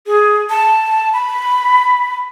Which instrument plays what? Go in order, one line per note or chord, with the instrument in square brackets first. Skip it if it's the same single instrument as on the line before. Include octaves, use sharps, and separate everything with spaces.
[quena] G#4
A5
B5